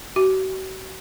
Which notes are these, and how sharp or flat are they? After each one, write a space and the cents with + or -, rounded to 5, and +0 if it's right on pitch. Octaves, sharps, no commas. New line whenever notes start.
F#4 +40